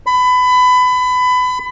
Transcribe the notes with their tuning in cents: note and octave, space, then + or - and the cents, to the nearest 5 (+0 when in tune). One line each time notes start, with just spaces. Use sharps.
B5 +25